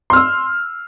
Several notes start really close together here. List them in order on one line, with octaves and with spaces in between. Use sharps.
C6 F6 E6